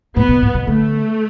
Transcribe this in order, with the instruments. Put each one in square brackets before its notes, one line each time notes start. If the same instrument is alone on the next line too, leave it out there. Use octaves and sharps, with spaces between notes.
[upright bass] A2 [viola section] B3
[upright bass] B2
A2
B2
[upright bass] D3 [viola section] A3